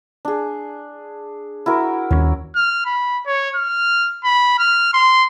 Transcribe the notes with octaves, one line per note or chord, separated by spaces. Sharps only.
D4 G#4
E4 F#4 A#4
D#2 B3 C#4 C#5
F6
B5
C#5
F6
B5
F6
C6